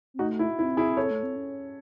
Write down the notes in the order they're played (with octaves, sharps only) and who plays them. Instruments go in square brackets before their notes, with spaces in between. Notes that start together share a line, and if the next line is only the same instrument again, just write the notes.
[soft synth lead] C4
[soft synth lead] A3 [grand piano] D#4 F#4
[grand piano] E4
[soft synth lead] C4 [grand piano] E4
[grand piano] E4 G#4
A4 C#5
[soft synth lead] A3
C4
C#4